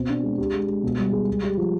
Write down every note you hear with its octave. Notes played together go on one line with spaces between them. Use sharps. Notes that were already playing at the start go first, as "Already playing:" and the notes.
Already playing: B2 C4
D4
G#3
G4
G#3
G#3
B2
G3
G#4
G#3
G4
F3